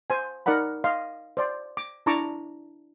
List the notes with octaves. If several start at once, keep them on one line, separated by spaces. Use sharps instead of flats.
C5 G#5
D#4 A#4 D5 F#5 B5
D#5 F5 C6
C5 D5 C6
D6
D4 E4 A5 A#5 C#6 D6